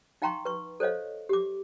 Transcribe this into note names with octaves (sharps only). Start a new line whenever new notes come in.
D#4 F5 G5 A#5 C6 C#6
B4 C#6
A4 C5 C#5 D#5 F5
G4 D6